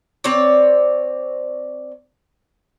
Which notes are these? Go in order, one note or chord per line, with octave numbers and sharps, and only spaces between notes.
C4 C#5 D5